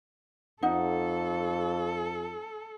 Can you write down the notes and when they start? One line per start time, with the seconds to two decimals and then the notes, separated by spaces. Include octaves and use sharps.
0.63 F2 D#4 A4 F#5